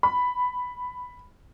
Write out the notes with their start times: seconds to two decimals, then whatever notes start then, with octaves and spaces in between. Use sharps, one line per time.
0.03 B5